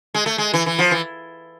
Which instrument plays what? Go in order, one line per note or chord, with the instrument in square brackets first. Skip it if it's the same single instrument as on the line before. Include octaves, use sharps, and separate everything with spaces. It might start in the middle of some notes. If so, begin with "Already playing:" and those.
[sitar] G#3
A3
G#3
E3
E3
F3
E3